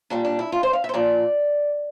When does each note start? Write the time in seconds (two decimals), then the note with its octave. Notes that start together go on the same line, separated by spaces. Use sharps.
0.10 A#2 G3 D4
0.25 D4
0.39 E4
0.52 F4
0.63 C5
0.73 F5
0.84 E5
0.89 C5
0.94 A#2 F3 D5